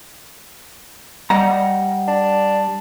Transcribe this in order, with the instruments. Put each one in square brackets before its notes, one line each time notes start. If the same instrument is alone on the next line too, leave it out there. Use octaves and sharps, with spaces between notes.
[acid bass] G3 [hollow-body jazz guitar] D#5 F#5 A#5
[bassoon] D4